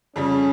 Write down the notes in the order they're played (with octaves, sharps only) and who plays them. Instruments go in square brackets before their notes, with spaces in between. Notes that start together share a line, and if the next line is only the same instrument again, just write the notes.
[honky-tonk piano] F2 C#3 G3 [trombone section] C#4